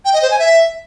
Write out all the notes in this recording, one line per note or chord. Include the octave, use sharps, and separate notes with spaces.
G5
D#5
C5
G#5
E5